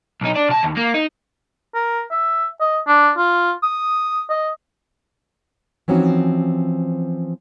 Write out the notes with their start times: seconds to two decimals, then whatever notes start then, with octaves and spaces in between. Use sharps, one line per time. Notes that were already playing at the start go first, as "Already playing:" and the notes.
0.21 B1 D#4
0.35 D4
0.49 B2 A5
0.63 D#2
0.77 A#3
0.94 D#4
1.75 A#4
2.11 E5
2.60 D#5
2.87 D4
3.17 F4
3.63 D#6
4.30 D#5
5.88 E3 F3 C4 C#4 D#4 F#4